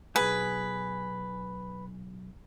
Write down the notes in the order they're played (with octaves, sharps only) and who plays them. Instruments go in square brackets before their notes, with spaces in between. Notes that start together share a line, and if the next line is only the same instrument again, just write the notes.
[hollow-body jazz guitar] B1 G#4 [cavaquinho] B4